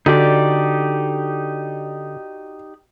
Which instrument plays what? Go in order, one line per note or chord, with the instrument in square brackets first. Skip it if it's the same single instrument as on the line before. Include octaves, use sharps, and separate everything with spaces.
[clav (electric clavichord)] D3 [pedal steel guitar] D#4 G4 D5 [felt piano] F#4